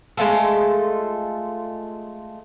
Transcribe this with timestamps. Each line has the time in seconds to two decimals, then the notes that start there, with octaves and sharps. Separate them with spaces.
0.17 G#3 A3 F4 A4